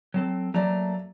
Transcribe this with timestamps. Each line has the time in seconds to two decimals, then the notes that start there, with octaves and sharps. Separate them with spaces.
0.14 F#3 C4 A4
0.54 F#3 A3 A#3 D5 A#5